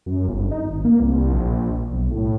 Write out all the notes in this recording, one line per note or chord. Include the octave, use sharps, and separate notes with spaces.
F#2
G1
D#4
G#1
A#3
C2
A#1
B1
A2